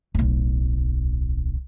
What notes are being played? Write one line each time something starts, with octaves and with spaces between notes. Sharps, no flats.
D1 B1